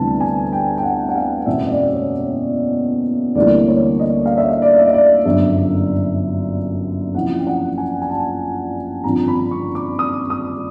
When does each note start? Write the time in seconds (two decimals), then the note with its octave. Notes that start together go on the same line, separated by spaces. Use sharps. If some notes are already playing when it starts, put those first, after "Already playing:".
Already playing: D2 C3 E3 G3 B3 A5
0.20 G#5
0.52 G5
0.77 G5
0.83 F#5
1.09 F#5
1.15 F5
1.46 F#1 E2 B2 G#3 C4 E5
1.66 D#5
1.71 D5
1.93 C#5
2.17 C#5
3.35 D2 C3 E3 G3 A#3 D5
3.68 C#5
4.00 D#5
4.26 F5
4.37 E5
4.49 D#5
4.62 D5
4.78 E5
4.86 D#5
4.94 D5
5.25 G1 F#2 D3 E5
7.15 F#1 F2 C3 E3 F#5
7.38 G5
7.47 F#5
7.78 G#5
8.02 G#5
8.09 A5
9.04 G#1 G2 D3 F3 A#5
9.28 B5
9.51 C#6
9.75 D6
9.99 D#6
10.30 D#6